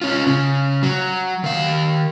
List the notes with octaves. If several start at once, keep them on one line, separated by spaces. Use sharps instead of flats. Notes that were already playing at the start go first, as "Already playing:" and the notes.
C#4 F4
C#3
F#3
D#3 F5